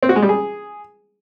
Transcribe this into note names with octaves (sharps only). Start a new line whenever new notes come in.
C4
F#4
G#3
G3
G#4